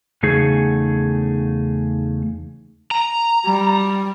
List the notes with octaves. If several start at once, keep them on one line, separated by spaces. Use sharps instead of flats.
E2 C#3 A3 D#4 G#4
A#5
G3